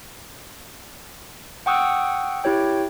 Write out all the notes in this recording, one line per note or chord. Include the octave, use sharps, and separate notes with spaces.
F#5 G5 C#6 D#6 E6 F#6
E4 G4 C#5 G5